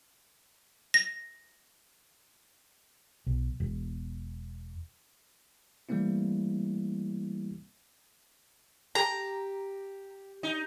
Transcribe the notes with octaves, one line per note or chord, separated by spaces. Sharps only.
A#6
B1
E1
E3 G3 A3 A#3 C4 E4
G4 A#5
D#4